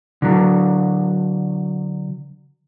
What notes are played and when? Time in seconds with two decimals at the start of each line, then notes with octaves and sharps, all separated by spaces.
0.22 D3 F#3